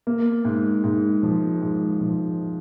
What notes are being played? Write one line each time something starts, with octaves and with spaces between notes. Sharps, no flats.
A#3
G#2
G#2
F3
G#2
F3